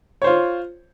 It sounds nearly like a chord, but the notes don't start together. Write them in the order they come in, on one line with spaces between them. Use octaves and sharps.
C#5 C5 F4